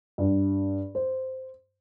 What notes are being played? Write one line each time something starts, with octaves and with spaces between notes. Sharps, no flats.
G2
C5